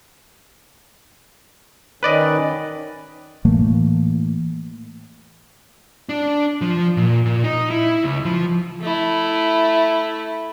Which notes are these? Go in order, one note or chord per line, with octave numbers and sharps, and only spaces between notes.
D#3 C#4 B4 D5 D#5
A2 E3 A3 A#3
D4
F3
A#2
A#2
D#4
E4
C#2
F3
A3 E4